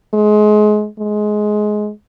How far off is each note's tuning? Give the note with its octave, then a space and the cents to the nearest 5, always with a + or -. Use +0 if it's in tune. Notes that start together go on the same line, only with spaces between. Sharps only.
G#3 +25
G#3 +15